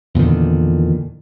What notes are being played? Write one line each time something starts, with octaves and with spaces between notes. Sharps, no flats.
E2 A#2 D3 D#3